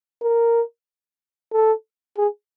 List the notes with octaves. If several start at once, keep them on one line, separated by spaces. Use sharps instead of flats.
A#4
A4
G#4